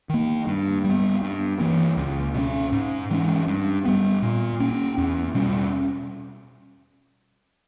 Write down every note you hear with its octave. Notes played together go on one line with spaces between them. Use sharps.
D#3 A#3
G2
G3 B3
G2
E3 A#3
C#2
B2 G#3 C#4
G#2
E3 G#3 C#4
G2
G3 B3
A#2
A#3 C#4
E2
B2 G3 C#4